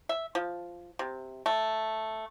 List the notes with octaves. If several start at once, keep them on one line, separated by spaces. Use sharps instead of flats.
E5
F3
C3
A3